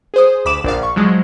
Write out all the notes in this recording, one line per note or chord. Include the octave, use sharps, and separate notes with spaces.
G#4 C5 D#6
D2 B5 D6 E7
A#1 D5 F5
C#6
F3 F#3 G#3